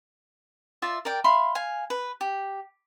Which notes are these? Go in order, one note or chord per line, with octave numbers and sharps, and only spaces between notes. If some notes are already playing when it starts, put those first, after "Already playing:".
F4 D5 E5
A#4 D5 G5
E5 F5 B5 C6
F5 G#5
B4
G4